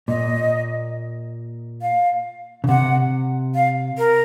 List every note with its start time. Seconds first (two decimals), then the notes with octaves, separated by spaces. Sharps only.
0.08 A#2 D#5
1.82 F5
2.64 C#3
2.68 C3 F#5
3.55 F5
3.98 A#4